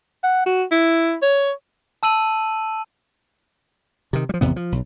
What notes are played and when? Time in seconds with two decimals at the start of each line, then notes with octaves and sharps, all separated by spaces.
0.24 F#5
0.46 F#4
0.71 E4
1.22 C#5
2.03 A5 E6 D#7 F#7
4.13 C3 D#3
4.29 F3 G3
4.41 G#1 E2 C3 B3
4.56 F3
4.72 B1